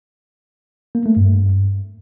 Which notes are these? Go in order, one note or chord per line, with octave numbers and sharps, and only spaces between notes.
A#3
A3
G2